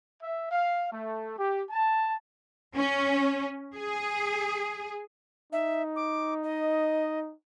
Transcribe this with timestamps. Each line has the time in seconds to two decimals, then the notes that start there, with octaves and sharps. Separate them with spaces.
0.22 E5
0.51 F5
0.92 A3
1.38 G4
1.70 A5
2.77 C#4
3.75 G#4
5.53 D#4 E5
5.96 D6
6.43 D#5